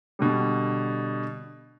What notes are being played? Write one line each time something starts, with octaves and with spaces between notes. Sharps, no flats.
B2 D3 G3